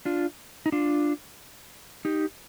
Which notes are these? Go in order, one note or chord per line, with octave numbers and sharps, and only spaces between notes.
D4 F4
D#4
D4 F4
D#4 G4